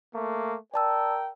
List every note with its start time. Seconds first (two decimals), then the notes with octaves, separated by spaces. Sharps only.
0.14 A3 A#3
0.74 A#4 D5 G5 A5 E6